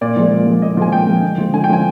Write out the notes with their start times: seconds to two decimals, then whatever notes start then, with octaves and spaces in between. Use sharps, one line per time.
0.01 A#2 D5
0.16 F3 G#3
0.32 A#2
0.46 F3 G#3
0.62 A#2 D#5
0.77 F3 G#3 G#5
0.92 A#2 G5
1.07 F3 G#3
1.22 D3
1.38 F3 G#3
1.53 D3 G#5
1.64 G5
1.69 F3 G#3 G#5